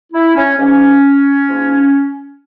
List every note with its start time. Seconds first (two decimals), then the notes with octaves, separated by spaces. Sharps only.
0.13 E4
0.35 C#4
0.57 G#2 F3 A#3 C#4
1.46 G#2 F3 A#3